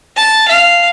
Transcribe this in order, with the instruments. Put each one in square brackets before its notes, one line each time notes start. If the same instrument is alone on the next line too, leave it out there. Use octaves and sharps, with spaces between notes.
[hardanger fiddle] A5
F5